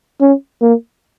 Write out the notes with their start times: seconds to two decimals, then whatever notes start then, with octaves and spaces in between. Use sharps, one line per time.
0.21 C#4
0.62 A#3